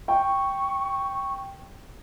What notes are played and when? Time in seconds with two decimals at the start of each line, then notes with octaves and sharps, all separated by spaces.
0.08 G5 C#6